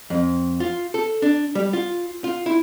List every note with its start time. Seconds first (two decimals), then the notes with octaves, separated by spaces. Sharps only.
0.10 F2
0.60 F4
0.94 A4
1.22 D4
1.55 G3
1.73 F4
2.24 F4
2.46 E4